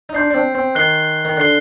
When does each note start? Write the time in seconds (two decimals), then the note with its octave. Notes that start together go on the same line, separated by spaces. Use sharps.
0.09 D#4
0.14 D4 C6 G6 C7
0.30 D4
0.34 C4
0.55 C4
0.75 D#3 F#6 C7 G7
1.25 D#3
1.37 D3 F#6 C7 G7